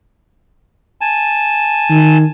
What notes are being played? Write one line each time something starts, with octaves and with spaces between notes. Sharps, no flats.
G#5 A5
D#3